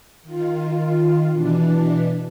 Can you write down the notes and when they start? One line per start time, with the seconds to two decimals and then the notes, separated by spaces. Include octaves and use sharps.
0.23 D#3 F4
1.33 B2 E3 D4